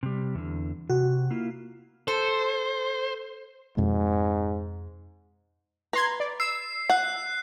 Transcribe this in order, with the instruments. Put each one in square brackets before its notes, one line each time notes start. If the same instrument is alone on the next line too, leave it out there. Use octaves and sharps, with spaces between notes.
[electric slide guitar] C3 G3
E2 D3
[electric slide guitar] C3 [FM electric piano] F#4
[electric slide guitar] A#3 E4 F4
[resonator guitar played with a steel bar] A4 [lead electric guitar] C5
[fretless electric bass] F2 B2 G#3 [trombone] G#2
[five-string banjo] B4 [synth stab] A#5 C6 G#6
[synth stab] D5
[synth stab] E6 [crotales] C7
[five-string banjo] F#5 [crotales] F#6 C7